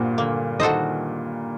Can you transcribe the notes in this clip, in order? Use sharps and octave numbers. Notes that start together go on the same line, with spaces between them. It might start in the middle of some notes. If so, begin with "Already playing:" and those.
Already playing: G2 A#2 F#4 C5
D3 A#3
D#3 F#4 A4 C5 D#5